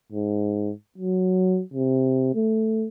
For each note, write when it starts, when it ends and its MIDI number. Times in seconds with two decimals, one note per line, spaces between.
0.12 0.72 44
0.98 1.62 54
1.74 2.30 48
2.35 2.87 57